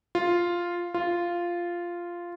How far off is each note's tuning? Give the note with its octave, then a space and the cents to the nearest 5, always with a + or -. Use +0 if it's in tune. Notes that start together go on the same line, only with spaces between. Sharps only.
F4 +0
F4 -5